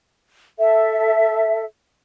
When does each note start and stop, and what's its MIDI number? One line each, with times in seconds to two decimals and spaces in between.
0.59 1.64 69
0.59 1.64 76